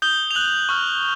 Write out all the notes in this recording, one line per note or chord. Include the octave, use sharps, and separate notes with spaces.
D#6 G6 G7
F7
F#6 F#7
C#6 F6